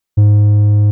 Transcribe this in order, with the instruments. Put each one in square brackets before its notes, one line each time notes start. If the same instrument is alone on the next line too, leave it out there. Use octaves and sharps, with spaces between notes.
[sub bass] G#2